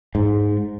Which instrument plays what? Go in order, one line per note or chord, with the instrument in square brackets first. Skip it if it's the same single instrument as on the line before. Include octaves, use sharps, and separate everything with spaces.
[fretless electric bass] G#2